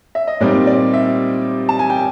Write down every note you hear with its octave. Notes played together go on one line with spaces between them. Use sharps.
E5
D#5
A#2 G3 C4 D#4 D5
D5
E5
A5
G#5
G5